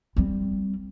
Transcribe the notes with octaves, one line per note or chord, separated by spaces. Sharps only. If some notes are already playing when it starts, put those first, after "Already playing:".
G3 C4